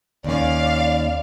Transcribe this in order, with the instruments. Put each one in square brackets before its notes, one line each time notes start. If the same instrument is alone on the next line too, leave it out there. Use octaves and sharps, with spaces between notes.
[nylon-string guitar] D#2 C#4 [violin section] D5 F5